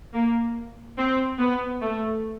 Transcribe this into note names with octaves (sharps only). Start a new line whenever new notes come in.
A#3
C4
B3
A3